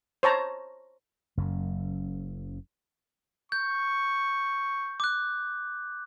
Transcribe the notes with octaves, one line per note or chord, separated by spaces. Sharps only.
C5 C#5 A5 A#5
F#1 F#2
C#6 G6
D6 F#6